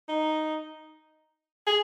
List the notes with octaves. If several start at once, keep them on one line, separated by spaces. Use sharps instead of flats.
D#4
G#4